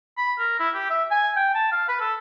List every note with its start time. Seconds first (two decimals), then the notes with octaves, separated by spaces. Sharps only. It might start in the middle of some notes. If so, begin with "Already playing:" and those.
0.18 B5
0.38 A#4
0.59 E4
0.74 G4
0.90 E5
1.11 G#5
1.36 G5
1.55 A5
1.72 F5
1.88 B4
2.00 A4